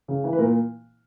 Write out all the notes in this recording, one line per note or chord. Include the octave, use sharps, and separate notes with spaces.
C#3
E3
B4
A#2 A#4